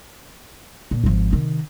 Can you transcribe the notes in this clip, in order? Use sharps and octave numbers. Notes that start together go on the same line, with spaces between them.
A#2
G#1 F3
C3 D#3